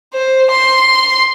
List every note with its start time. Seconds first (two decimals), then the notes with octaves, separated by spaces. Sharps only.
0.14 C5
0.51 C6